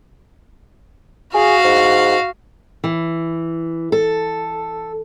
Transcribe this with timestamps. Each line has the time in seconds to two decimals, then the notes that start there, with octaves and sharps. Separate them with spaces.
1.34 F#4 G#4 F5
1.64 G#2
2.84 E3
3.92 A4